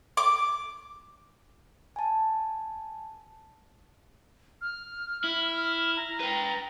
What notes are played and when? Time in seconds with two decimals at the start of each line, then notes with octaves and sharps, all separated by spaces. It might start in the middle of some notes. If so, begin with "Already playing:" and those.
0.17 D6
1.96 G#5 A5
4.61 F6
5.24 E4
5.51 F6
5.97 A#5
6.21 B4 G5